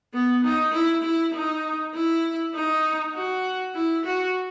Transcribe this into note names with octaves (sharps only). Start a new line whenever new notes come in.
B3
D#4
E4
E4
D#4
E4
D#4
F#4
E4
F#4